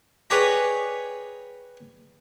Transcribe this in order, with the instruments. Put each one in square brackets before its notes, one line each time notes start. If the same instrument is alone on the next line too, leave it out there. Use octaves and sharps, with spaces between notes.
[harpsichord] G#4 B4 C#5 D5 G5 A#5